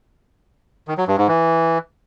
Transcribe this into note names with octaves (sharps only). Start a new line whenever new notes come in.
D#3
F#3
G2
G#2
E3